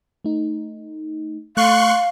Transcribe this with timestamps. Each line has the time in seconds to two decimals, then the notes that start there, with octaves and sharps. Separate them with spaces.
0.25 A3 D#4
1.57 A3 F5 C6 C#6 F6 F#6